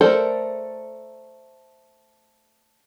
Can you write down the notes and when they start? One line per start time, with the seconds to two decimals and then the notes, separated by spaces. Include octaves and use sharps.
0.01 A3 A4 A#4 C5 D5